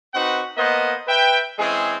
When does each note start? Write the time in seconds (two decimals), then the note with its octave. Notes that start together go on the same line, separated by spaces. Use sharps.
0.14 C4 D#4 F#4 B4 F#5
0.57 A#3 B3 C5 D#5
1.07 B4 E5 G5
1.58 E3 G#3 C4 C#4 G#4